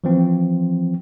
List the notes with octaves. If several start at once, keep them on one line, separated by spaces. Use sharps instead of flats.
E3 F3 C4